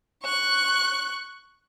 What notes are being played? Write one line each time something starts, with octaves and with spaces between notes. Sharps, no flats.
C#6 F#6